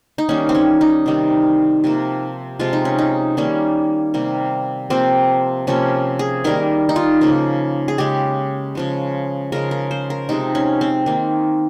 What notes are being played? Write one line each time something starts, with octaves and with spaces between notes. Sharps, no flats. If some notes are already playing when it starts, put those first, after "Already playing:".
D#4
D#3 G3 A#3 C#4
C4
C#4
D#4
C3 D#3 G3
C3 F3 A#3
C3 F3 G#3 F4
D#4
C#4
D#4
D#3 G3 A#3 C#4
C3 G3 A#3
C3 F3 A#3 C4
C3 F3 A#3 C#4
G#4
D#3 G3 A#3 A#4
D#4
F4
C#3 F3 A#3
G#4
C#3 G#3 G4
C#3 F3 G#3
C#3 F3 G#3 A#4
A#4
C5
A#4
C3 F3 G#3 D#4
C#4
C4
D#3 A#3